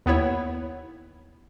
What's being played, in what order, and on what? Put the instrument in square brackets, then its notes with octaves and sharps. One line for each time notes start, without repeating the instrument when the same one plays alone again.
[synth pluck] D#2 B3 E4 C#5